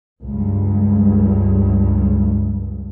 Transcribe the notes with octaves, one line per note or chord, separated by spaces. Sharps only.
C#2 G2